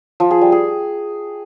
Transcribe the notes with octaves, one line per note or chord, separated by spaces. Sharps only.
F3
G#4
G3
G#4